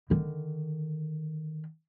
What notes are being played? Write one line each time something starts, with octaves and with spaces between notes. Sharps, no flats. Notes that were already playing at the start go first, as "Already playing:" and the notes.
D3 D#3